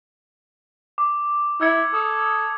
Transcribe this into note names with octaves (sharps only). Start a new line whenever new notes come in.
D6
E4 E6 G#6 C#7
A4 D#6